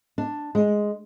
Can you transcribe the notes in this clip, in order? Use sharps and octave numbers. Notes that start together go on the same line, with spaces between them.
D4
G#3